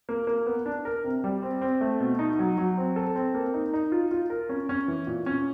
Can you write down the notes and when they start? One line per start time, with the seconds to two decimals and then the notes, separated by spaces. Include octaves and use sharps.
0.09 A#3
0.27 A#3
0.46 B3
0.66 D4
0.85 A#4
1.04 C3
1.24 G3
1.42 C4
1.61 C4
1.81 A3
2.00 B2
2.19 D#4
2.39 F#3
2.58 F#3
2.77 C4
2.96 A4
3.16 C4
3.34 A#3
3.54 D#4
3.73 D#4
3.92 F4
4.11 F4
4.30 A#4
4.49 C#4
4.69 C#4
4.88 E3
5.07 A#2
5.26 C#4